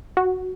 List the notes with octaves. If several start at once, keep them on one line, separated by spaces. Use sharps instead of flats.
F#4